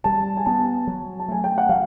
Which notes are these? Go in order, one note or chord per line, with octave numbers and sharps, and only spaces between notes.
G3 A5
G#5
B3 A5
F#3
A5
A3 G#5
G5
F#5
F#3 F5